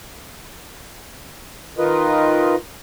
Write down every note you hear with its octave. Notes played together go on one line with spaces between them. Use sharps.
D#3 D#4 F4 A#4 B4 D#5